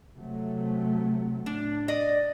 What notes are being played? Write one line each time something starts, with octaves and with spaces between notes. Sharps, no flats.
C3 F#3 A3
A2 D4
D5 D#5